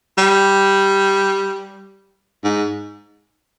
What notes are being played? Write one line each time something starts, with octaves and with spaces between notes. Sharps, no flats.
G3
G#2